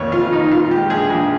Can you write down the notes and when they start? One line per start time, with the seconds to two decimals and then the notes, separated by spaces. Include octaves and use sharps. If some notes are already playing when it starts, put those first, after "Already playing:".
Already playing: F1 F2 D#3 A#3 C#5
0.12 F2 F4
0.32 D#3 D#4
0.51 A#2 F4
0.71 G#3 G4
0.90 A#1 G#4
1.10 A#1